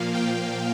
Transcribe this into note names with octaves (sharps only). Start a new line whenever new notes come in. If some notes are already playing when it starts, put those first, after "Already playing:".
Already playing: A#2 F3 A#3 F5
G5